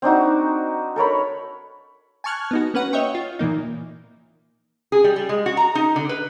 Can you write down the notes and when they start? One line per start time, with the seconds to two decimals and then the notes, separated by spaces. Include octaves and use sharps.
0.02 C4 D4 D#4 F#4
0.96 A4 A#4 C#5 B5
2.24 G#5 A5 C#6 F6 F#6 G#6
2.51 B3 D#4 F#4
2.74 A#3 C#4 B4 F#5
2.93 C#5 D#5 E5 G5 C#6
3.15 F4
3.39 A#2 E3 A#3 D#4
4.92 G#4
5.04 G3
5.16 G3
5.29 G#3
5.46 F#4
5.57 A#5
5.75 D#4
5.96 D3
6.09 B4